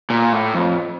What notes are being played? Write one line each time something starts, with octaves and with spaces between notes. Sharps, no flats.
A#2
A2
F2